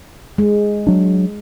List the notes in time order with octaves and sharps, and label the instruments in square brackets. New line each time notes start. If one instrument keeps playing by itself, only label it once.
[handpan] G#3
[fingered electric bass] F#3 D4